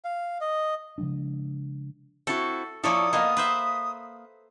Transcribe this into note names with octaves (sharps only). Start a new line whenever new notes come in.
F5
D#5
C#3 F3 G#3 D4
C4 E4 F#4 A4
F3 A#3 E4 A4 C#5 D5 D#6
A#3 B3 D#5 F5
B4 C5 E5